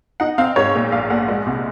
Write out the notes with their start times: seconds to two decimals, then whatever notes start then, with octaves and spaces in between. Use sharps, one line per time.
0.20 D#4 F#5
0.38 C4 F5
0.56 G#2 C#5
0.75 A#2
0.92 A#1 F5
1.10 A#1 F#5
1.28 G#3
1.46 C2